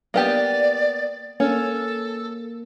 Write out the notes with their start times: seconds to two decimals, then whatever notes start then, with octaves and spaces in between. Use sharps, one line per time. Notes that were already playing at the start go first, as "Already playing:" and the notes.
0.14 A#3 B3 G4 D5
1.40 A#3 C#4 A4